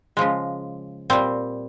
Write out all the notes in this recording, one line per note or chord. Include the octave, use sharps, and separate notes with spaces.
C#3 F3 G#3
A#2 G3 C4